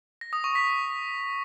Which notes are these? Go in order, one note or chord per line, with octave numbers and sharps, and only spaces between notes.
A#6
D#6
C#6
B6